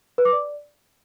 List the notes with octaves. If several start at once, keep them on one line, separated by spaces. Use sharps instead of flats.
B4
D6
D5